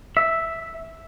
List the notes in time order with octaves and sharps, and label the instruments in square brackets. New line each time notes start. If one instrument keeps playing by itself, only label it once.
[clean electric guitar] E5